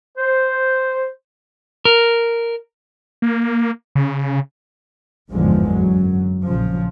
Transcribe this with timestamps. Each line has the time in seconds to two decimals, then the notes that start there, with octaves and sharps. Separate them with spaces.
0.17 C5
1.85 A#4
3.22 A#3
3.95 C#3
5.32 G#1 E2 G2 D3 F3 G#3
5.75 F#2 F#3
6.47 A#1 C#3 F3